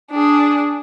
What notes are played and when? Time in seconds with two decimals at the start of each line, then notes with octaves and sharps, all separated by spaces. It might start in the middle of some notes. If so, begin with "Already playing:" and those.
0.11 D4 G#4